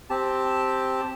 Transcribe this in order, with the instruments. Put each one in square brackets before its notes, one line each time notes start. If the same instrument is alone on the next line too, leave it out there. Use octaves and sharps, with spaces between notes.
[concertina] C4 G4 A5